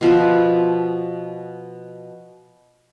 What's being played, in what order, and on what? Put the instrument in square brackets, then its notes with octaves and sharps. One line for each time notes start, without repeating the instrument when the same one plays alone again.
[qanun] B2 F3 E5 B5